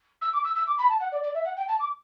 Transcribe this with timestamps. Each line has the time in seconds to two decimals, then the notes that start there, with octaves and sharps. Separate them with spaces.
0.21 E6
0.33 D6
0.44 E6
0.55 E6
0.67 D6
0.78 B5
0.89 A5
1.00 F#5
1.11 D5
1.23 D5
1.34 E5
1.45 F#5
1.56 G5
1.68 A5
1.79 D6